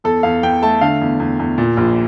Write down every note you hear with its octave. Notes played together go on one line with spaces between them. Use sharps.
E2 A4
E2 F5
E2 G5
A3 A5
D3 F5
E2
E2
E2
A#2
A#1